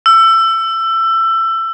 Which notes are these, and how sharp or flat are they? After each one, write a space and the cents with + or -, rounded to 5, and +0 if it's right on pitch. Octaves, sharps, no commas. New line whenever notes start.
E6 +20